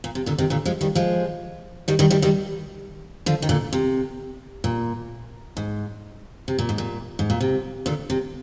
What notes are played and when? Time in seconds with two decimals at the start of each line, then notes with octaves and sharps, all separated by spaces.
0.04 A#2
0.15 C3
0.26 A#2 D3
0.38 C3 D#3
0.50 A#2 D3
0.66 F3 G#3
0.81 D#3 G3
0.95 F3 G#3
1.88 D#3 G3
1.99 D#3 G3
2.10 D#3 G3
2.22 D#3 G3
3.26 D3 F3
3.42 D#3
3.49 A#2 D3
3.73 C3
4.64 A#2
5.57 G#2
6.48 C3
6.59 A#2
6.69 G#2
6.78 A#2
7.19 G#2
7.30 A#2
7.41 C3
7.86 A#2 D3
8.10 C3